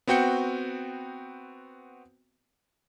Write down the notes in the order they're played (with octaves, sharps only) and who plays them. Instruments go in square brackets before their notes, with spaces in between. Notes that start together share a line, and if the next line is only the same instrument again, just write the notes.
[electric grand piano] B3 C4 F#4 G5 G6 C#7